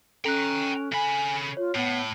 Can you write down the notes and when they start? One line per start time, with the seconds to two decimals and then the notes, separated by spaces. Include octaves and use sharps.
0.25 C#4 A4 G5 A#5 F#6
0.92 C#3 G#5 B5
1.57 F4 C#5
1.75 A2 B3